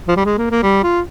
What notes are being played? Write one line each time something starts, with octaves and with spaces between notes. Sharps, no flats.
F3
G3
G#3
A#3
A#3
G3
F4